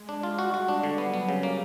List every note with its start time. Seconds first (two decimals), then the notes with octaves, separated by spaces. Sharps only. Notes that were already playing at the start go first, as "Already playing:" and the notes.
Already playing: G#3
0.09 D4
0.23 F4
0.39 G3 F#4
0.54 F#4
0.69 D4
0.83 D3
0.98 F#3 B3
1.14 B3
1.29 C#3
1.43 A#3